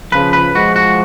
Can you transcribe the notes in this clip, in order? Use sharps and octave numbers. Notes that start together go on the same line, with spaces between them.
C#3 F3 B4
B4
F3 G#3 F#4
F#4